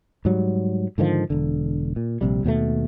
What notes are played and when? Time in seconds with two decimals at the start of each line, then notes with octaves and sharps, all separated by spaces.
0.25 G#2 F#3 G3
0.98 G#2 D3 D#3 F3
1.30 E1 D3
1.96 A#2
2.21 A#1 C3 G3
2.44 D#2 B2 F#3 A3